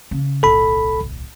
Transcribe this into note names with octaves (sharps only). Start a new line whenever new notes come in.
C#3
D1 B1 A4 B5